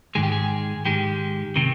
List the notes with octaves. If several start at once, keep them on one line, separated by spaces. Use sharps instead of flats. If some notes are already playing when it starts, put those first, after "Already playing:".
G#2 D#3 G#3 G#4
G4
G#4
G#2 D#3 G#3 G4
C3 D#3